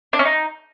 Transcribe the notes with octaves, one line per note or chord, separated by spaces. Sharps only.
D4
C#4
D#4